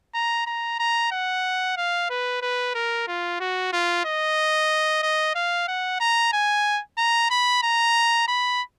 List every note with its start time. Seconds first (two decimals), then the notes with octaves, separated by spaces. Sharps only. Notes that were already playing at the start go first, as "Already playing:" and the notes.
0.15 A#5
0.47 A#5
0.80 A#5
1.12 F#5
1.77 F5
2.10 B4
2.42 B4
2.75 A#4
3.07 F4
3.40 F#4
3.73 F4
4.05 D#5
5.03 D#5
5.35 F5
5.68 F#5
6.00 A#5
6.33 G#5
6.98 A#5
7.30 B5
7.63 A#5
8.28 B5